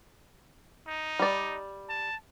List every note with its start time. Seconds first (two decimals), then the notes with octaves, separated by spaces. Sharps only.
0.87 D#4
1.19 G3 D5
1.89 A5